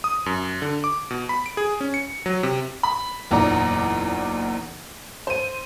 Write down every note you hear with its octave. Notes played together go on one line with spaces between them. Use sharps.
D#6
F#2
D3
D6
B2
B5
D7
G#4
C#4
C#7
F#3
C3
B5
F#1 E2 A#2 D#4 D5 A#5
C5 D#7